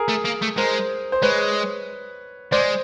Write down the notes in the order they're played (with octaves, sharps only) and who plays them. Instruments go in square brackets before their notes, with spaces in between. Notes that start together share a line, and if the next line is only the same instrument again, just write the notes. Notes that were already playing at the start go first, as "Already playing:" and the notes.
Already playing: [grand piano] G#4 A#4
[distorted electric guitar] A3
A#3
A3
[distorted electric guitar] G#3 [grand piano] A#4 C5
[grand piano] C5
[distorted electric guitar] G#3 [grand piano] B4 C#5
[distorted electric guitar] G#3 [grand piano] C5 D5